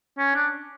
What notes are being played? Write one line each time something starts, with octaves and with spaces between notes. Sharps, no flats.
C#4
D4